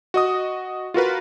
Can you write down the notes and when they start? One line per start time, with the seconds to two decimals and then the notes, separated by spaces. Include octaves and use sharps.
0.14 F#4 D#5 D#6
0.94 F4 F#4 A#4 B4